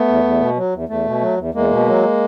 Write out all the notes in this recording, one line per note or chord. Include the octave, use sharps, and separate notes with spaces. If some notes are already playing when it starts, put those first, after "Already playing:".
Already playing: A3 B3
E2
E2
B2
F#3
E2
E2 A3
B2
F#3
E2
E2 G#3 A#3
B2
F#3